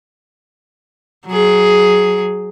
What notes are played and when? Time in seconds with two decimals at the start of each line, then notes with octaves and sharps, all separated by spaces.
1.27 F#3 G#4